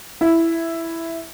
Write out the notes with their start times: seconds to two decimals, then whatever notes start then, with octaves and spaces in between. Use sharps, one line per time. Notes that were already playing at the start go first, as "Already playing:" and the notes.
0.21 E4